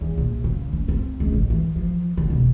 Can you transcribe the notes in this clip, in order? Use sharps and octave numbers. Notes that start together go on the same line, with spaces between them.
E2
A#1
C#3
C#4
C4
C#2
A1
E3
F3
D3
E1